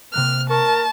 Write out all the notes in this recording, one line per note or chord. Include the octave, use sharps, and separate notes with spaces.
C3 A#3 F6 F#6
A#4 A5 C#6